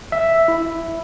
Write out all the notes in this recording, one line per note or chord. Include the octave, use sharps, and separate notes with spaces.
E5
E4